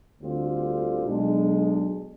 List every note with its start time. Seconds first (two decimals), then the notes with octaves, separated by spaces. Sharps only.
0.19 D2 D3 G3 C4 F4
1.04 B1 B2 G#3 D4